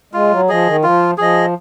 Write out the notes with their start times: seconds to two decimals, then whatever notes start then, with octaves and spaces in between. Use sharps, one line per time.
0.13 G#3 F4
0.31 F#3
0.49 F3 G#4 D#5
0.67 D#3
0.83 F3 F4
1.18 F3 G#4 D#5